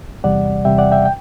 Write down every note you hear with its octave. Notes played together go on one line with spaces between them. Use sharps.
E2 C3 G3 D5 F#5
E2 C3 G3 E5 G5
D5 F#5
E5 G5
G5